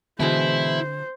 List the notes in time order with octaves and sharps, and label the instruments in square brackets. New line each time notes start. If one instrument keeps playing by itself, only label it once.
[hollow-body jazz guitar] B2 E3 G#3 [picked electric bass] D3 [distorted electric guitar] E4 [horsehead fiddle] C5